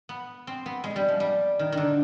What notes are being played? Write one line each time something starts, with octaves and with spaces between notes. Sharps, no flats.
B3
C4
B3
G#3
G3
F3
G3
D#3
D3 D#3